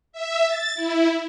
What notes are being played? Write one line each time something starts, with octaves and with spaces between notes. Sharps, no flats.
E5
A6
E4